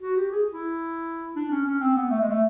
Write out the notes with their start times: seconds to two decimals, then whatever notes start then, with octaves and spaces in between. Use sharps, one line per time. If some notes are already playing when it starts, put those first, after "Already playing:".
0.01 F#4
0.17 G4
0.32 G#4
0.51 E4
1.36 D4
1.51 C#4
1.65 C#4
1.80 C4
1.96 B3
2.10 A3
2.21 G#3
2.30 A3